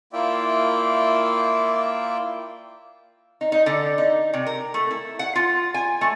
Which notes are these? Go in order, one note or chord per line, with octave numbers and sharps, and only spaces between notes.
A#3 E4 F4 D5 E5 G5
D#4
D#4
D3
D#4
C3
A#4
A3
E4
F#5
F4
G#5
A3